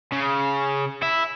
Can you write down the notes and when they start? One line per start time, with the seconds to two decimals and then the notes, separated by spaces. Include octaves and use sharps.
0.12 C#3
1.03 E4